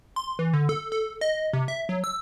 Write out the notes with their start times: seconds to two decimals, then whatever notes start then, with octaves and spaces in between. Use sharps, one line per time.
0.16 C6
0.39 E3
0.53 D3
0.69 A4
0.92 A4
1.21 D#5
1.53 C3
1.68 E5
1.89 F#3
2.04 E6